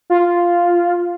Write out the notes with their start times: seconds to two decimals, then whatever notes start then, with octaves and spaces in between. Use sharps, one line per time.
0.10 F4